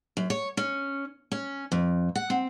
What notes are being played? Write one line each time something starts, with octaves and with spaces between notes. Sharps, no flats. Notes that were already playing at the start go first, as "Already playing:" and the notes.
F#2
C#5
C#4
C#4
F2
F#5
C4